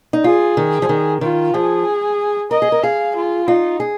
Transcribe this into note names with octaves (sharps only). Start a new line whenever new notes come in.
D#4
F4 G#4
D#3
F3
D#3
D#3 F4
F3 G#4
A#4 D#5
G#4
A#4
G#4 F5
F4
D#4 F4
G#4